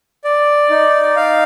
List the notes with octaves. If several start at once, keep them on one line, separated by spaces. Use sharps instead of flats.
D5
D#4
F5